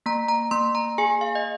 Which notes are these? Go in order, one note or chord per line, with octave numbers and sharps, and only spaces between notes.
A#3 A#5
A#5
A#3 C6
A#5
G#4 G#5
F5
D#5